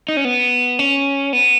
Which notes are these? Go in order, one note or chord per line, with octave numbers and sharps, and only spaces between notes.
D#4
C#4
B3
C#4
B3